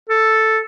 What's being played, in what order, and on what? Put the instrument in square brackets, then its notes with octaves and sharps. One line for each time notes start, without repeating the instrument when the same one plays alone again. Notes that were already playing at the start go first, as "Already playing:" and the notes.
[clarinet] A4